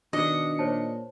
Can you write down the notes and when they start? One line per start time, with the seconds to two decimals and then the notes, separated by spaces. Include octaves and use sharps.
0.13 B2 D#3 D4 D#5 C#7
0.59 A#2 C5 C#5 A5